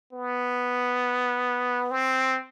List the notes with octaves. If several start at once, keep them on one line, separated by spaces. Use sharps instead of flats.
B3
C4